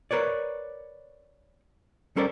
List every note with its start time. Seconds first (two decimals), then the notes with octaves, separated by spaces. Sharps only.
0.11 A#4 B4 C#5 D5
2.16 G3 C#4 A4 A#4 C5 D5